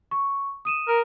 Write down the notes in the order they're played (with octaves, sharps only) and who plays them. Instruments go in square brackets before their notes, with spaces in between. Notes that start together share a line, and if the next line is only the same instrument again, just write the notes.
[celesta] C#6
D#6 D#7 E7
[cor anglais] A#4